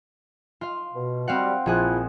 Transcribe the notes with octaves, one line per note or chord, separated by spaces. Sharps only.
F4 F5
B2
G3 C4 F#4 F5 F#5
A#1 F3 E4 F4 G#4 F#6